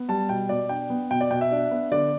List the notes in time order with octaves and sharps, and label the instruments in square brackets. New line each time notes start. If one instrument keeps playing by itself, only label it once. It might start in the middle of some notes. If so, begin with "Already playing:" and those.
Already playing: [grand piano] B3
G3 A5
B2 G5
B2 D5
D4 G5
B3
B2 G5
D5
B2 G5
E5
D4
B3
D3 D5